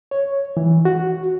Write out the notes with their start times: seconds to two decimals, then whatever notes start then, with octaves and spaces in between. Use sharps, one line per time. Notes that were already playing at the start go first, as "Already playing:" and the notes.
0.11 C#5
0.57 E3
0.85 F#4